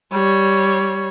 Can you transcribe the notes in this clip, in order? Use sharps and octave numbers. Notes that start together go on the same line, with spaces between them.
G3 C#5